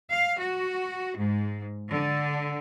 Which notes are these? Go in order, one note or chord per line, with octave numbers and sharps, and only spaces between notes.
F5
F#4
G#2
D3